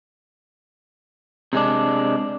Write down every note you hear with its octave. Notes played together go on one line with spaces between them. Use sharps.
C3 G#3 D4